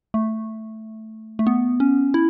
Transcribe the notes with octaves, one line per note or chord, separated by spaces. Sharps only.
A3
A3
B3
C#4
E4